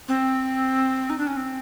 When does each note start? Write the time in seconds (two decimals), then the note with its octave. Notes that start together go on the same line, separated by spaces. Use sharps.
0.08 C4
1.10 D#4
1.18 D4
1.27 C#4
1.37 C4